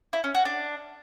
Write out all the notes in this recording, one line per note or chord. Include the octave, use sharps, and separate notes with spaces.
E4
C#4
F#4
D4